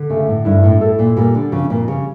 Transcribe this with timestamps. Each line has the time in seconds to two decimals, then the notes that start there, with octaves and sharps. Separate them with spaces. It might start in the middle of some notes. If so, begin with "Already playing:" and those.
Already playing: D3
0.10 C#3 A3
0.28 A2
0.45 G2 E4
0.64 A2
0.81 A2 A4
0.99 A#2
1.17 A#2 G3
1.35 D3
1.52 F2 C#3
1.70 A#2
1.87 C#3 G3